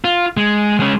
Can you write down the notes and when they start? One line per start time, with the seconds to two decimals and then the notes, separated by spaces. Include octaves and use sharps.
0.04 F4
0.37 G#3
0.80 G#3 C#4